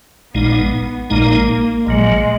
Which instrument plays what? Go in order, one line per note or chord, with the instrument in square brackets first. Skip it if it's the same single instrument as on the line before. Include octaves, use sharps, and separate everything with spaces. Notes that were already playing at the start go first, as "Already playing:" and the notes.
[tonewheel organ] A#1 A#2 G#3 D#4 [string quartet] B3
[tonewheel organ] A#1 A#2 G#3 D#4 [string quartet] A#3
[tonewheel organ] A#1 A#2 F#3 [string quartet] G#3